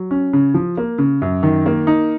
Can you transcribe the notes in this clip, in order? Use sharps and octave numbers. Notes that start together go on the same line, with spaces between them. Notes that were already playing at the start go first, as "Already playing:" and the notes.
Already playing: F#3
C#4
C#3
F3
A#3
C#3
F#2
D#3
A#3
D#4